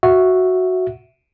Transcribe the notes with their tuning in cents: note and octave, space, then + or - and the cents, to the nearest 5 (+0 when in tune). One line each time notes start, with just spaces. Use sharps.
F#4 +0 E5 +0